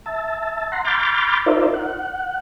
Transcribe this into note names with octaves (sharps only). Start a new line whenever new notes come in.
E5 A5
F#5 A#5 C6
B5 C6 D6 F6 G6 A6
D#4 F4 A#4 C5 D5 E5
F#5